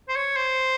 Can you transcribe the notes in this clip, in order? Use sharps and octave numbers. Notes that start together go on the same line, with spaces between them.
C5
C#5
C5